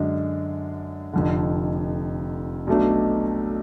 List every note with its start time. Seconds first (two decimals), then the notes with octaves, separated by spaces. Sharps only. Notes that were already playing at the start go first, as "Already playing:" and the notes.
Already playing: F#2 D3 G#3 D4
1.13 F1 F2 D3
2.67 B1 B2 A3 D4